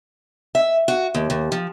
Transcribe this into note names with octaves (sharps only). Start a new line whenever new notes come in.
E5
F#4
D#2
D#2
F3